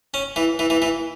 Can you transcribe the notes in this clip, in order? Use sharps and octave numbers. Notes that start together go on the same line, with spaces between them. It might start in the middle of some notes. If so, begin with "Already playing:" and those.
C#4
E3
E3
E3
E3